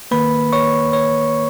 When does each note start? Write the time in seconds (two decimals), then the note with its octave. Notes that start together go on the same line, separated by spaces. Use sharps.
0.11 D#3 A#3 B4 B5
0.53 C#5 C#6
0.93 C#5 C#6